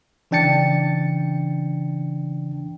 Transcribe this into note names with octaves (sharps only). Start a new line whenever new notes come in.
C#3 E3 D4 G5 A6 C#7